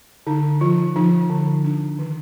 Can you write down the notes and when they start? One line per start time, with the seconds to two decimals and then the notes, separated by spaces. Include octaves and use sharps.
0.27 D3 D#4
0.61 F3 F4
0.96 F3 D#4
1.30 D3
1.64 D4
1.99 D#3